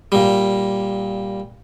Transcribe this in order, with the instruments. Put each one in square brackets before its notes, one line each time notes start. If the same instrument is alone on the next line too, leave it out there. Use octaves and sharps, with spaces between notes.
[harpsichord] A#2 G3